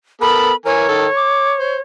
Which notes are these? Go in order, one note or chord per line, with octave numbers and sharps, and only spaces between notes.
B3 A4 A#4 B5
E3 A#4 C#5 G#5
D#3 A4
D6
C5